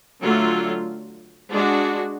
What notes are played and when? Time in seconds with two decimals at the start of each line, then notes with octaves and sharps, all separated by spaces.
0.22 D3 F#3 A3 F4
1.52 G#3 D4 F#4